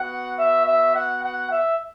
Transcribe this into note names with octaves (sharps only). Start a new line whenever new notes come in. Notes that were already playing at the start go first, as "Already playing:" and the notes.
Already playing: B3 F#4 F#5
E5
E5
F#5
F#5
E5